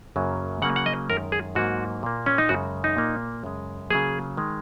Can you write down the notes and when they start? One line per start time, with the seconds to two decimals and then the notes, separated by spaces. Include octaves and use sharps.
0.16 F#2 C#3 F#3 A#3
0.62 C#3 F#3 A#3 F#5
0.76 F#5
0.86 D#5
1.09 F#2 D#3 G#3 A#4
1.32 G#4
1.55 G#2 F#3 A#3 F#4
2.03 A#2 A#3
2.26 C#4
2.38 D#4
2.49 F#2 C#3 G#3 F#4
2.84 D#4
2.96 A#2 A#3
3.44 F#2 C#3 G#3
3.90 C#3 F#3 A#3 G#4
4.37 D#3 G#3